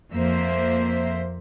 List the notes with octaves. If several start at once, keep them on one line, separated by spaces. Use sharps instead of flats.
F2 A#3 C5 E5